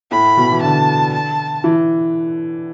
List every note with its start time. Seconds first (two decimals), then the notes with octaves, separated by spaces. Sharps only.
0.12 A2 B5
0.37 B2
0.51 E3
0.62 D3 A5
1.13 A5
1.64 E3